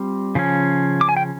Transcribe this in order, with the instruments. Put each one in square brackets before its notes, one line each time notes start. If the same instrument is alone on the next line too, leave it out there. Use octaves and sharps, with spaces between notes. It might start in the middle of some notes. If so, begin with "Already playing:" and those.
Already playing: [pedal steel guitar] G3 C4 F4
C#3 F3 C#4
D6
G#5
G5